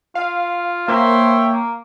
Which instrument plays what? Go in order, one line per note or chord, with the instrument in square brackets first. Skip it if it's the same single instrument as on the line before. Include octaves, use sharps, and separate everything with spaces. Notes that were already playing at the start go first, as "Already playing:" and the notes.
[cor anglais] F4 [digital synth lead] F5
[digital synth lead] A#3 [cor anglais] C5 [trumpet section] C#5 E5 G5
[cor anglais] A#3